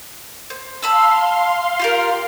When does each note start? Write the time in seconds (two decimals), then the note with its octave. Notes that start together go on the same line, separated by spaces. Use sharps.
0.50 C5
0.82 F5 A5 B5 C6 E6
1.79 F4 G4 A#4